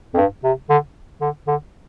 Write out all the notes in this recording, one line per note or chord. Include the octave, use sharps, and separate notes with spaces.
F2
G2
C3
D3
D3
D3